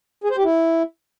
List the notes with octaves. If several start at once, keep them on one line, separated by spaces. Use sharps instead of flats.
G#4
C5
G4
E4